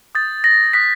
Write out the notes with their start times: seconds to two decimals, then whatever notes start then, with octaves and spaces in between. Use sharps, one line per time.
0.15 D#6 G6 A6
0.44 A#6
0.73 D#6 F#6 B6